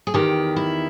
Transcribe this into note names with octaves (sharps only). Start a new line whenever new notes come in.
G#4
E2 D#3 G4
E4